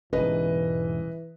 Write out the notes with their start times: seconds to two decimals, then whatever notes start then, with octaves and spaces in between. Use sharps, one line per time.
0.13 E1 G#2 C#3 E3 G3 C#4 B4 D#5